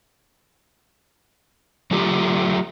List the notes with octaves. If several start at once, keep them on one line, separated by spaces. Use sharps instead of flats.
F#3 A3 F4 G4